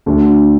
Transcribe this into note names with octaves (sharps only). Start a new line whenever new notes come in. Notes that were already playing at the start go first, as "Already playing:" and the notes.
D2 D3 D4